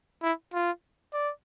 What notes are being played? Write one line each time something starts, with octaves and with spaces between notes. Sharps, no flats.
E4
F4
D5